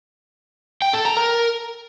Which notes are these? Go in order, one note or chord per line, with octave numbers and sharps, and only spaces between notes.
G5
A4
A#5
A#4